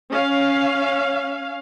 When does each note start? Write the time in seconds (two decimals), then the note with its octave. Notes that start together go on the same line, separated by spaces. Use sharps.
0.11 C#4 F5